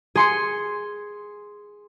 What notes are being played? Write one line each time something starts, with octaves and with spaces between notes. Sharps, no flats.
G#4 C6 C#7